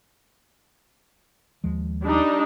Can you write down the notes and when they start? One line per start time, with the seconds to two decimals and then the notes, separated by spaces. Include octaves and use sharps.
1.64 D#2 F3 G#3
2.02 G3 D4 D#4